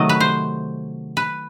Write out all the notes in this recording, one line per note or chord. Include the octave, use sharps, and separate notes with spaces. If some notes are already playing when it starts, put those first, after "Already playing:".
Already playing: C3 D#3 F#3 A3 D#5
B4
C5
B4